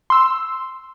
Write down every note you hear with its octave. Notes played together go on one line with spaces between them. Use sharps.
C6 E6